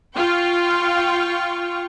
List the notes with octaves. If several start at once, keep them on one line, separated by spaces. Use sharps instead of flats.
F4 G5 C#6